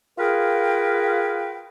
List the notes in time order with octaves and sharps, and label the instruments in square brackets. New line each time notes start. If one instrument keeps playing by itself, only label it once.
[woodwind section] F4 G#4 A#4 B4 F5 G5